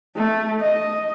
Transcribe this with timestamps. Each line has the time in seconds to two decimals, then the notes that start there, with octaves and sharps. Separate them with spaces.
0.17 A3
0.61 D#5